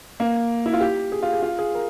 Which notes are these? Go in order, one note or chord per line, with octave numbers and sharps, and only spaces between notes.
A#3
E4
F4
G4
G#4
F4
G#4
F4
G#4
A#4